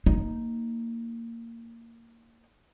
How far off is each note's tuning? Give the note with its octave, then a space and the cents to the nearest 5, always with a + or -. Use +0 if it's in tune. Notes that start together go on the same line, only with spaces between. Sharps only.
A#3 -15 D#4 +0